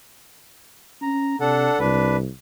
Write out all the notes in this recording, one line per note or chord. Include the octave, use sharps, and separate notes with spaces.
C#4 A#5
C3 D4 A4 F#5
C2 D4 B4